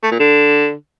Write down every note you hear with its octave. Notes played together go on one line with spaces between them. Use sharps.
A3
A#2
D3